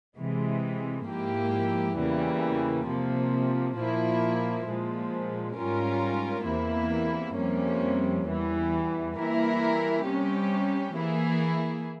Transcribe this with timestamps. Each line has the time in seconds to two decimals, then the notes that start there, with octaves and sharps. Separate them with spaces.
0.17 C3 E3 G#3
1.07 G#2 F3 A#3 E4 G4
1.98 E2 C#3 E3 G3 A#3
2.87 C3 F3 A#3
3.77 A#2 F3 A#3 E4
4.67 A#2 F3 G#3
5.56 G#2 G3 C#4 F4 A#4
6.46 E2 C3 E3 A#3 E4
7.36 F2 C3 G3 A#3 C#4
8.27 E2 E3 G3
9.16 E3 G3 A#3 E4 A#4
10.06 C3 G3 C#4 G4
10.95 E3 A#3 E4 G#4